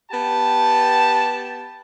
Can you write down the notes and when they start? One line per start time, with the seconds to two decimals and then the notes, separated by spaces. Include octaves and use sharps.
0.11 B3 G4 G5 A5